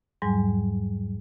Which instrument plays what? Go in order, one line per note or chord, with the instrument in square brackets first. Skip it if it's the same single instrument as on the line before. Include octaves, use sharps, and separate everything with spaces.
[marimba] E2 G#2 F#3 G3 G#5